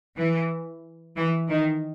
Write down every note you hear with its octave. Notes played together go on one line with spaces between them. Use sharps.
E3
E3
D#3